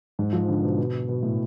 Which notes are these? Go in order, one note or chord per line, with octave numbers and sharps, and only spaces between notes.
G#2
F3
D3
B2
B2
B2
A2